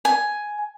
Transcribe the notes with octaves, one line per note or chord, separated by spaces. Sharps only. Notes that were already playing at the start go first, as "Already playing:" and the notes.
G#5